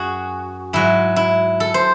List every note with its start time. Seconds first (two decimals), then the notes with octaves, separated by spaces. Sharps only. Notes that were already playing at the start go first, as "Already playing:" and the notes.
Already playing: F#2 F#4 G#4
0.73 G#2 F#3 E4
1.16 E4
1.60 A4
1.74 C5